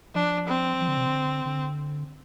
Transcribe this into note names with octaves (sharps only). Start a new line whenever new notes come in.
F3 D4
C4
F3
D3
C3
D3
D3